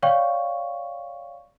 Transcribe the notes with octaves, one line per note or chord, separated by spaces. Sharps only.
C#5 D5 F5 G5 C#6